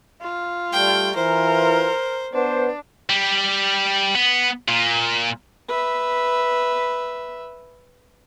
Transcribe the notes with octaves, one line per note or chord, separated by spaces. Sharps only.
F4
G3 A3 G5
E3 F4 A#4 C5
B3 D4 C5
G3
B3
A#2
B4 E5